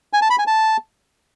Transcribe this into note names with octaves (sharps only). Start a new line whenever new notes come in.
G#5
A5
B5
G#5
A5